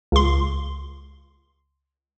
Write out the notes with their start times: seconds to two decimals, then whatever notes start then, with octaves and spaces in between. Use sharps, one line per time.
0.12 C#2 C6